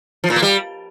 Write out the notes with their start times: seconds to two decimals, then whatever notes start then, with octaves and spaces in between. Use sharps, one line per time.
0.24 F3
0.30 A#2
0.36 A#3
0.42 G3